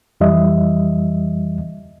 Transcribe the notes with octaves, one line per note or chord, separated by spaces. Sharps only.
F2 E3 G3 D#5 E5